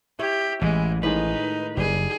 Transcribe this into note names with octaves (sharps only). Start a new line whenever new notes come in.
E4 G4 C#5
A1 E3 G#3
A2 D#3 G#3 D#4 B4
F#1 G3 G#4